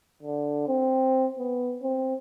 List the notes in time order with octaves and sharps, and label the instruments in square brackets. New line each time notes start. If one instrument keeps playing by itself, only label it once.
[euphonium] D3
C4
B3
C4